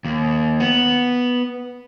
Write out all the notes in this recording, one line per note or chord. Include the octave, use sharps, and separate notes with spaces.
D#2
B3